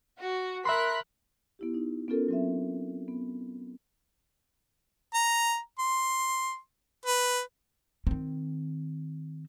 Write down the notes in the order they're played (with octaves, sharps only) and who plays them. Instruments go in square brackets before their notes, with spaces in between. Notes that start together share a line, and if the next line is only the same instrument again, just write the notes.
[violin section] F#4
[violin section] A#4 F#6 B6 [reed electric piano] E5 B5 C6
[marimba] B3 E4 G4
D#4
B3 C#4 F4 A4 A#4
F#3 C4 E5
B3
[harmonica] A#5
C6
B4
[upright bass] D#3 C4